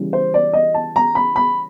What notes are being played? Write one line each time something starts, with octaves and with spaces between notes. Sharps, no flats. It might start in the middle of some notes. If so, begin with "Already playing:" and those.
Already playing: C#3 E3 G3
C5
D5
D#5
A5
A#5
B5
B5